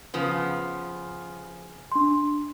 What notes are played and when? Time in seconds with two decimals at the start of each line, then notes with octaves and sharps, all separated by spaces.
0.14 C#3 F3 B3
1.92 D4 C6